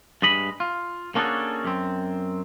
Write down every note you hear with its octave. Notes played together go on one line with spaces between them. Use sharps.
G2 G#3 D#5 B5
F4
A#3 C#4 D4 F#4 G#4 A4
F#2 C4